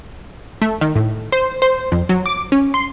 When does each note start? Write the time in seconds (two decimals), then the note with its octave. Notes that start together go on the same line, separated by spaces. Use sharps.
0.62 A3
0.81 D#3
0.96 A2
1.32 C5
1.62 C5
1.92 F2
2.09 F#3
2.26 D6
2.52 C#4
2.74 C6